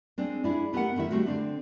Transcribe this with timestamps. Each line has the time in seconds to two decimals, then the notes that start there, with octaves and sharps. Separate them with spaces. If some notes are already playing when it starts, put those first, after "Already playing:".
0.18 G#3 C4 D4
0.44 D4 E4 G#4
0.73 A3 B3 G4 A4 A#4 F#5
0.96 D3 D#3 E4 E5
1.11 G3 A3 C4 F#4
1.26 D3 C4 D4